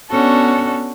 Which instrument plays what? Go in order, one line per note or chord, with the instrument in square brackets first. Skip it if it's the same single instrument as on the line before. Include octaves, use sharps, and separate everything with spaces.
[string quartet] B3 C#4 D4 F#4 A4